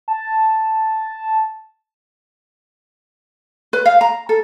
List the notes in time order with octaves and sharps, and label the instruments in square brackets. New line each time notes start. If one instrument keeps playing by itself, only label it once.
[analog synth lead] A5
[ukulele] B4
F5
A#5
A4